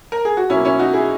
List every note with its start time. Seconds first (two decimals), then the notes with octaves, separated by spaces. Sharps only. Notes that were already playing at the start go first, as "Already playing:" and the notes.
0.12 A#4
0.25 G#4
0.37 F#4
0.50 B2 F#3 A#3 C#4 E4
0.65 C#4 E4
0.79 D#4 F#4
0.93 E4 G#4